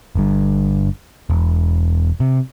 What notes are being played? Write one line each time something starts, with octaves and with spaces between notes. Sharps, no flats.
G1 G2
E1
C3